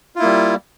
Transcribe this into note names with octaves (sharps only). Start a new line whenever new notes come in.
G3 A#3 E4 F4